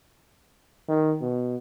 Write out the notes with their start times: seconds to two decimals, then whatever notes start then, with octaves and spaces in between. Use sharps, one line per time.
0.88 D#3
1.21 B2